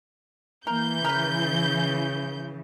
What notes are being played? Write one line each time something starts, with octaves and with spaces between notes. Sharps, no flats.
E3 A#3 A#4 G6
C#3 A#4 B4